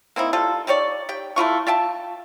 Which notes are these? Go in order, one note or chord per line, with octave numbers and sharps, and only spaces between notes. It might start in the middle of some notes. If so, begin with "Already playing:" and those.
A#3 C4 D#4 E4
G3 F4 A4
D#4 G4 C#5 D5
G4 G5
A3 E4 F4 C#6
F4 E5 G5 A5